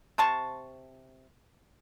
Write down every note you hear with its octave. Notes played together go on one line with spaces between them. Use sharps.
C3 C5 A5 C#6